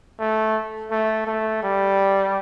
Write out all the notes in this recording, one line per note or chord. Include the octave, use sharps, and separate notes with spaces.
A3
A3
A3
G3